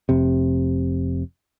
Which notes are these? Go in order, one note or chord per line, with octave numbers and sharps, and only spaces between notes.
F1 C3